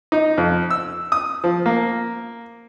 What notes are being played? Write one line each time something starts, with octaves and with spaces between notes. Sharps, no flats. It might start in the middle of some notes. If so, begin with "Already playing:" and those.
D#4
F2
E6
D#6
F3
A#3